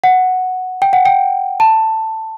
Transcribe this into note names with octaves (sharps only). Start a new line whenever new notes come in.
F#5
G5
F#5
G5
A5